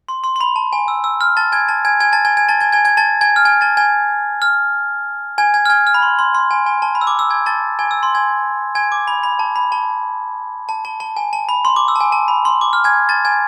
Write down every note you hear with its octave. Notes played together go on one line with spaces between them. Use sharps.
C6
C6
C6
B5
A5
G#5
E6
E6
F6
A5 A6
G#5 G#6
A5 A6
G#5 G#6
G#5 G#6
A5 A6
G#5 G#6
G#5 G#6
A5 A6
G#5 G#6
G#5 G#6
G#5 G#6
A5 A6
G#5 G#6
F6
G#5 G#6
A5 A6
G#5 G#6
F6
G#5 G#6
G#5 G#6
F6
G#5 G#6
F6
B5
C6
C6
C6
G#5
G#5
A5
B5
E6
D6
E6
G#5 G#6
A5 A6
G#5 G#6
E6
C6
G#5 G#6
G#5 G#6
D6
B5
B5
A5
B5
A5
A5
A5
A5
G#5
A5
B5
C6
D6
E6
A5
G#5
A5
B5
C6
D6
F6
G#5 G#6
A5 A6
G#5 G#6